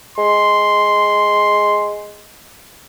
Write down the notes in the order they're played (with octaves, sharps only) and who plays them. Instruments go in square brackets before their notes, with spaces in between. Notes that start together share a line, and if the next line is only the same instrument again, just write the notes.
[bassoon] G#3 [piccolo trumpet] C6